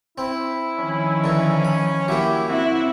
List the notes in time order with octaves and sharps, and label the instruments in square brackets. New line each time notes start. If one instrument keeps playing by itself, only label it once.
[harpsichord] C4 [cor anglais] E4
[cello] D#3 F3 [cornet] C#4
[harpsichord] D3 E3
B5
[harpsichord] F#3 A#3 [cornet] E4 [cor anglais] G4
[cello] C4 E4 [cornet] F#4 [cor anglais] E5